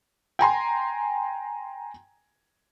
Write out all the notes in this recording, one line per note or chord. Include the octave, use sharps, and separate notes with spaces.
G5 G#5 A#5 C6